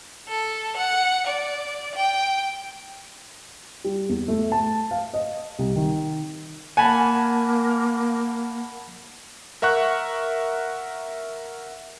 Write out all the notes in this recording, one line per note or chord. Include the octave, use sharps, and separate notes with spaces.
A4
F#5
D5
G5
G3
E2
A3
A5
F5
D#5
C2
D#3
A#3 F#5 G#5 A5 B5
A#4 E5 F#5 C#6 F#6